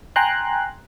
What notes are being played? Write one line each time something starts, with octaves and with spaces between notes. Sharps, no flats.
G5 G#5 A#5 C6 F#6